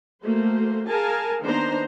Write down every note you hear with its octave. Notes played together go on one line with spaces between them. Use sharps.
A3 A#3 F#4 C5
G#4 A#4 F5 G#5 A5
D#3 A#3 B3 D4 C5 A#5